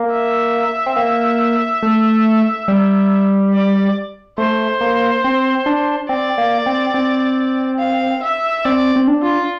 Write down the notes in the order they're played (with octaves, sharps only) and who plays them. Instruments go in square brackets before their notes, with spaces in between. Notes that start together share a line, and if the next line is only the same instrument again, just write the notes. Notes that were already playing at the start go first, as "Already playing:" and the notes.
Already playing: [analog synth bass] A#3
[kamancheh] E5
[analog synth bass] C4
A#3
A3
G3
[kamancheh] D5
[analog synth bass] A3 [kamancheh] C5
[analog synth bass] A#3
C4
D4
[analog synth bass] C4 [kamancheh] D5
[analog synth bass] A#3
C4
C4
[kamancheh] F5
E5
[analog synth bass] C4 [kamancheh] D5
[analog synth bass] C4
D4
[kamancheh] F4